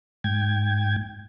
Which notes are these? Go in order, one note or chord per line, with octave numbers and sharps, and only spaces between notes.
G#2 G5 G#6